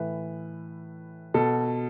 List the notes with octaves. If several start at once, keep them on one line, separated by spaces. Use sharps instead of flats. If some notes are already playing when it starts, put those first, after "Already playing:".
Already playing: A2 E3 B4
B2 A4